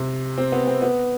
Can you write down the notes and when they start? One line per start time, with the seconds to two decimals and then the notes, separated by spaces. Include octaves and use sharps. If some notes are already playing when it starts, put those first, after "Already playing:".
Already playing: C3
0.38 C4
0.52 B3
0.67 C4
0.82 B3